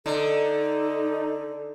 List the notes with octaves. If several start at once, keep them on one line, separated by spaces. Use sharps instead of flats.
D3 D#4 A4